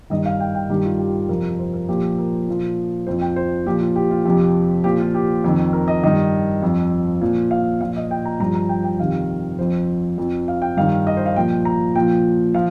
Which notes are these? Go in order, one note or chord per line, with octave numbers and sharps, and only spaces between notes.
G2 D#3 D#5
F5
G5
G5
G2 D#3 G4
F4
G4
F2 C3 F3 A#4
C5
A#4
A#2 F3 G4
A#4
A#2 F3
F2 F3 C5
G5
C5
A#2 F3 G4
F4
G4
F4
F2 C3 F3 G4
A#2 F3 G4
F4
G4
F2 D#3
A#4
D#5
G2 D#3 D#5
F2 F3
A#2 F3
F5
A#2 F3 F5
D#5
G5
A#5
G2 F3 A#5
A#5
G5
G5
F2 C3 D#3 F5
F2 F3 C5
F2 F3
F5
G5
G2 D#3 F5
D#5
C5
F5
A#2 F3 G5
A#5
A#2 F3 G5
F3 F5